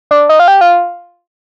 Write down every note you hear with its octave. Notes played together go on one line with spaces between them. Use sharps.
D4
D#4
F4
G4
F4